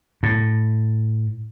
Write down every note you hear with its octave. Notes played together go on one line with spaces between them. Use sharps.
A2